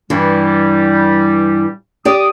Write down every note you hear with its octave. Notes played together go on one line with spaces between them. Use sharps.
G2 E3 G3
G4 D5 D#6